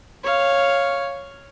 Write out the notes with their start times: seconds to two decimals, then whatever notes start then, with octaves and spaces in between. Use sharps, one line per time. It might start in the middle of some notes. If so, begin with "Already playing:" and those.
0.23 C#5 F5